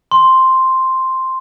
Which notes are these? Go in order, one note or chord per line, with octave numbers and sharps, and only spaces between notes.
C6